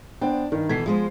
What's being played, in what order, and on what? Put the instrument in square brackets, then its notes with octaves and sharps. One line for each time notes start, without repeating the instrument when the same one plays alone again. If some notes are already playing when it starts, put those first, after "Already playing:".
[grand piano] B3 C5 G5 [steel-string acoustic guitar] D4
[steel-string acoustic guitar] G2 [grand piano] D#3
[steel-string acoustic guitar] B2 E3 A4 [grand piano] G#6 B6 C7
[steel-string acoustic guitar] F3 G#3 C5